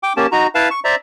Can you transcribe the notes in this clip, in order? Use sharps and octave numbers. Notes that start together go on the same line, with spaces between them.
G5 D6
A#3 C#4 G4 A5
D#4 F#4 A#5
E4 B4 F5 A5
C#6
C5 D5 E5 A#5